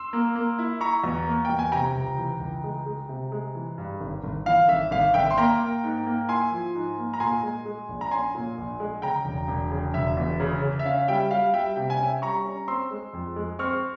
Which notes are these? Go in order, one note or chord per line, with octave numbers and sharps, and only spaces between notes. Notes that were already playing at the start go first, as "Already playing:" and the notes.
Already playing: C6 E6
A#3
A#3
E4
E4 A#5 C#6
E2
A#3
E2 G5
G#5
C3 G5 A#5
C#2
E3
C#2
G#3
G#3
C3
G#3
E3
G2
G#1
G#1
E3 F5
G#1 E5
G#1 F5
G#1 E5 G5
C6
A#3 G5 A#5
A#3
G#2
A#3
E4 G#5 C6
F3
G#2
A#3
A#5
A#2 G#5 C6
G#3
G#3
A#1
A#5
C#4 G#5 C6
A#2
A#1
G#3
C#3 G5 A#5
E1
E1
C#3
E1 E5
E2
C#3
C#3
E5
C#4 F5
G3 E5 G5
G3 F5
G3 E5 G5
C3 G5
G#5
C#4 E5 G5
G3 A#5 C#6
C#4
C4 C6 E6
G#3
F2
G#3
C4 C#6 F6